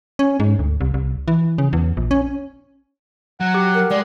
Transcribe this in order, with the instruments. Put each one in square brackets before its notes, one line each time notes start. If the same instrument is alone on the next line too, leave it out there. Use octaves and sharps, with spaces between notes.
[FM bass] C#4
G#2
D2
C2
C2
E3
C#3
E2
A#1
C#4
[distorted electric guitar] F#3 [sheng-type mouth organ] F#5
[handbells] G4
[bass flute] A#4
[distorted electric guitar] G#3 [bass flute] D5